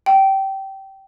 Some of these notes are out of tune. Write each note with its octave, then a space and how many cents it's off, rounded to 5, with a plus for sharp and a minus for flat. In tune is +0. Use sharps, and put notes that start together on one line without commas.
G5 -20